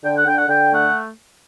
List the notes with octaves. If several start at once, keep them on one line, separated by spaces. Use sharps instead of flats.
D3 G5
F#5
D3 G5
F#5
D3 G5
A3 F#5